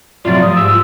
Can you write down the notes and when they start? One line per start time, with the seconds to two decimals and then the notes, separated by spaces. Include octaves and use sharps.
0.25 A2 C3 F#3 F4 D5
0.42 F3 G3 D#6
0.56 G#2 E6